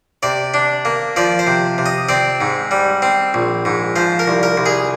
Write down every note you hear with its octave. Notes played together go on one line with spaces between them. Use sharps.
C3 D5
D4
A#3
F3 D5
C5
C3
C3
D#5
C4 D5
G#2
G3
C4
A#1
G#2
F3 C5
A#4
C2
A#4
C2
G#4